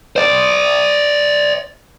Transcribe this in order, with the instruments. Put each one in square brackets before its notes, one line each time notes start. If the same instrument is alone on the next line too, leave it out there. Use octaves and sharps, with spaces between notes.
[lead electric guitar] C5 D5